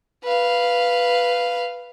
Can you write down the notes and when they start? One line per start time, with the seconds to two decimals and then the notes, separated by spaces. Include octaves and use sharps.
0.23 B4 F5